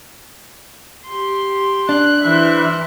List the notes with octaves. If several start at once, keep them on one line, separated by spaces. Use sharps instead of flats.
G4 C6
D4 F#6
E3 E4 C5 E5